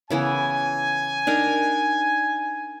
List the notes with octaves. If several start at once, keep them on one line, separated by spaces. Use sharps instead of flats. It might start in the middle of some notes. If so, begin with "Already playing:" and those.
C#3 E3 B3 G#5
D4 D#4 A#4